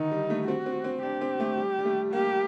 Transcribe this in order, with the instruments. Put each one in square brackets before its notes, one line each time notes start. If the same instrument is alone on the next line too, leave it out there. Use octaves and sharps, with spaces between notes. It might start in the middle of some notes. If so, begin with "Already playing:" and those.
Already playing: [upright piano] D3 D#3 [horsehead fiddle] D#4
[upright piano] G3
A3
[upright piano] C4 [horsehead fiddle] F#4
[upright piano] C4
C4
[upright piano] D4 [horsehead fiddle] G4
[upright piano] C4
A3
G3
G3
A3
[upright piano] A#3 [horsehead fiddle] G4